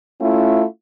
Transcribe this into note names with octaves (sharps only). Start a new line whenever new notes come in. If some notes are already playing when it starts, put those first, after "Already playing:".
A3 C#4 E4 F4